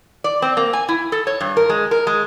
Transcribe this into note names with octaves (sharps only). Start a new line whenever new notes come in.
D5
C4
A#3
G#5
E4
A4
C#5
G2
A#4
G#3
A#4
G#3